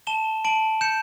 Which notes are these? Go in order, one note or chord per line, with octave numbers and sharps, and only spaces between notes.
A5 E7 G7
A5 D7 F#7
G6 C#7 E7